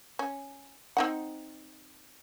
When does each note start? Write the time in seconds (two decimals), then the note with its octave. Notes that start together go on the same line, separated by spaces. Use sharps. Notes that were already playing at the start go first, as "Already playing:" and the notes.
0.19 C#4
0.97 C4 D#4 F#5